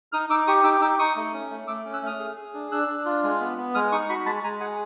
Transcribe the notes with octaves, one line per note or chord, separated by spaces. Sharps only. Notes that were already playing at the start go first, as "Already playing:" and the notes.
D#4 D#6 F6
D#4 D6 E6
G4 C#6 D#6
D#4 D6 E6
D#4 D6 E6
D#4 C#6 D#6
A3
C#4
A3
A3 D6 E6
C#4
E6 F#6
A3 D#6 F6
G#4
G#4
D4
D4 E6 F#6
D4
F4
G#3
B3
B3
G#3 D#6 F6
D#4 C#6 D#6
F#4 B5 C#6
G#3 A5 B5
G#3 G#5 A#5
G#4 F#5 G#5